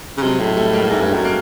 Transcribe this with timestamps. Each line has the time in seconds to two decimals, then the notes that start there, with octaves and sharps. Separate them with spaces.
0.17 C#3
0.22 C3 F#3 G#3
0.39 A2
0.57 G3 A3
0.73 G#3 A#3
0.90 G#2 G3 A3
1.02 G2
1.14 F#2
1.24 G#3 A#3